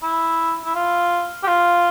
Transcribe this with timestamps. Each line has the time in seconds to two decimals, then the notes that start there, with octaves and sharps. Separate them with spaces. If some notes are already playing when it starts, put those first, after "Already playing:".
0.03 E4
0.65 E4
0.75 F4
1.43 G4
1.47 F4